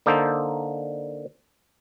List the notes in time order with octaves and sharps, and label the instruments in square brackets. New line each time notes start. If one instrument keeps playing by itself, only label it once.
[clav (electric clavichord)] D3 A#3 D#4 A4 C5